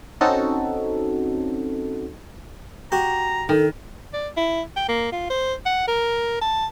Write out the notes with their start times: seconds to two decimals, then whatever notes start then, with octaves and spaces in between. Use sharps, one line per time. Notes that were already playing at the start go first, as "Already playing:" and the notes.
0.21 C4 C#4 D#4 F#4 A4
2.92 F#4 G4 A#5
3.49 D#3 A4
4.13 D5
4.37 E4
4.76 G5
4.89 A#3
5.12 F4
5.30 C5
5.66 F#5
5.88 A#4
6.41 A5